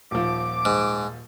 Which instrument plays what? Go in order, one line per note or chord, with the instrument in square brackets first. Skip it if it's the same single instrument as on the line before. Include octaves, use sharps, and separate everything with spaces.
[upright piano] D#1 F3 [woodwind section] D6
[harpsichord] G#2